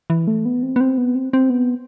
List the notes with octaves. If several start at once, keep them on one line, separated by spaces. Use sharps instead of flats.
E3
A3
B3
C4
B3
C4
B3
C4
C4
B3